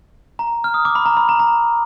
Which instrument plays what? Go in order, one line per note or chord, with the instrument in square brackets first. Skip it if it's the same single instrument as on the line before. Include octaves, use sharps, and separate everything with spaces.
[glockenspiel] A#5
F6
D#6
D6
B5
A#5
B5
A#5
A#5